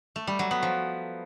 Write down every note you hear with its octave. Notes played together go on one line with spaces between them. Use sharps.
A3
G3
F#3
B3
F3